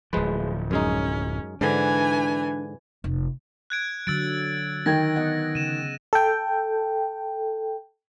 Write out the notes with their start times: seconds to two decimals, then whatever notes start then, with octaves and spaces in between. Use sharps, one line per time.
0.13 D1 F3 G#3 B4
0.71 F#2 G#3 C#4 D#4
1.61 G#2 D3 E3 D4 G#5
3.04 F1
3.70 F#6 G#6 D7
4.07 D3 F#3 E6 A6 D7
4.86 D#3 G5 G#6 A#6
5.16 B3 D#5 F#5
5.55 C#3 D#7 E7
6.13 A4 G5